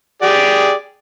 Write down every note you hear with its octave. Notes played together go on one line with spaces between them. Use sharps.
G4 G#4 D5